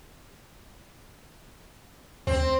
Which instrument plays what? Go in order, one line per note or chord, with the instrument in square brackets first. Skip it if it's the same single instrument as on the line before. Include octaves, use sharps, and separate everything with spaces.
[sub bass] D2 [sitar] C4